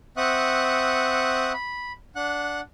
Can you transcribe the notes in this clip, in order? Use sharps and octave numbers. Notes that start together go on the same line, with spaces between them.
C4 E5 F#5 C#6 D#6 F#6
B5
D4 F#5 F#6